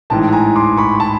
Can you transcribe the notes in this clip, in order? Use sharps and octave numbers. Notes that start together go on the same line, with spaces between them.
A1 G#2 E3 G5 A5
G#5 A#5
C6 D6
B5 C#6
A5 B5